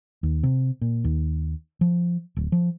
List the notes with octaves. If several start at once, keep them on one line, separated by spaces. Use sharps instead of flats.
D#2
C3
A#2
D#2
F3
D1
F3